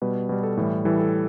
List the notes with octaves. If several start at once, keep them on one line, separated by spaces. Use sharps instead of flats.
B2 G3 B4
B2 G3 B4
A4
A2 E3 G3 A4
A2 E3 G3 A4
A4